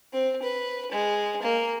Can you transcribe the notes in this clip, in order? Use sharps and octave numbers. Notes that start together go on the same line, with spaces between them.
C4
B4
G#3
A#3